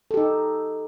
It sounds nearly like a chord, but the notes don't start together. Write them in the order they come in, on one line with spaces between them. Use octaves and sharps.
A4 G4 D#4